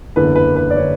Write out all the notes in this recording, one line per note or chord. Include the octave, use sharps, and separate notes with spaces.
F#1 E2 D3 B4
B4
B4
D5
D3 C#5